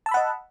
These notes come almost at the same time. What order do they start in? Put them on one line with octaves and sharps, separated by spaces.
A5 E6 B5 F#5 D#5